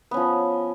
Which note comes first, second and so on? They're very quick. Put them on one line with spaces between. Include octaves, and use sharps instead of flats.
B3 C#4 F3